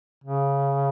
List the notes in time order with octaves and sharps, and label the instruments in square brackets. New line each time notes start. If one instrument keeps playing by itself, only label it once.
[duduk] C#3